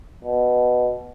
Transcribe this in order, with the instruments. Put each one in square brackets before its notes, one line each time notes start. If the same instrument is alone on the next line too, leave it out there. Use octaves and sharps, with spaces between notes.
[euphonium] B2